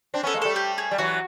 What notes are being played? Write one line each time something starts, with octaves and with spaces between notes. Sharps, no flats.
C4 D4
B3 C#4 A4
G#3 A#3
G3 A3 A4
G4
G#4
G3
E3 F#3 F#4